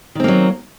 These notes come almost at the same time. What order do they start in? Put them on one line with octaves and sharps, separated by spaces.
D#3 C4 A#3 F#3